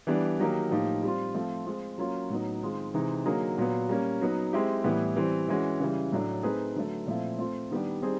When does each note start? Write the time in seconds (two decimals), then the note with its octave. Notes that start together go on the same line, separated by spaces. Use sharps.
0.07 E3 G3 B3 D4
0.39 D#3 F#3 A#3 D#4 G4
0.71 A2 F3 A#3 D#4 G4
1.03 G3 C4 F4
1.35 F3 A3 C4 F4
1.66 G#3 C4 F4
1.98 F#3 A#3 C#4 F4
2.30 A2 F#3 B3 D#4
2.63 D#3 G#3 C4 F4
2.94 C3 E3 G#3 C4 D#4
3.25 D3 F#3 A#3 D#4 G#4
3.58 A#2 F#3 B3
3.89 G3 A#3 C#4
4.21 F#3 B3 D#4
4.53 G#3 C4 E4 G4
4.84 A2 E3 G3 B3 E4
5.16 E3 G3 C4
5.48 E3 G#3 C#4 F#4
5.80 C#3 E3 G3
6.12 A2 F#3 A3 D4
6.43 A3 C4 D#4 G#4 B4
6.75 D3 F#3 A3
7.07 A#2 F3 A3 C4 E4
7.39 A3 C4 F4
7.71 D#3 G3 B3 D4 G4
8.02 G3 C4 D#4 G#4